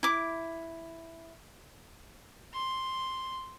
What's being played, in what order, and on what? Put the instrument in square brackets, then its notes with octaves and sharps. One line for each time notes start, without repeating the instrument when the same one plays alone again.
[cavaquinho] E4 D6
[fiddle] C6